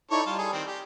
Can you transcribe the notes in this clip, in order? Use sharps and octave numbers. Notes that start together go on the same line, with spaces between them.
D#4 E4 A4 C#5 D5 C#6
G3 F4 A5
G#4 A4
D#3 C4
G4